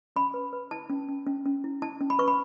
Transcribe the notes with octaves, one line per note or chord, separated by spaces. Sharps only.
C#4 B5
B4
B4
E4 A5
C#4
C#4
C#4
C#4
E4
E4 A5
C#4
B5
B4 C#6
B5